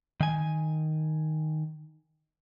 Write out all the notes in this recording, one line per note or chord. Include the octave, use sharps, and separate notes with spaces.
D#3 G#5